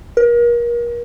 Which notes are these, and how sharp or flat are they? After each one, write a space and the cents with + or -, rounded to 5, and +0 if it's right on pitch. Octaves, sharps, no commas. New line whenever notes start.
A#4 +35